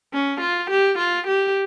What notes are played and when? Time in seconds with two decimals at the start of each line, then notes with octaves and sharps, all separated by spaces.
0.13 C#4
0.41 F4
0.70 G4
0.98 F4
1.27 G4